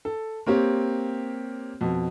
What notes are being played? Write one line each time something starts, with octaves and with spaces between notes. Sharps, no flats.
A4
A#3 C4 G4 C#5
F2 B2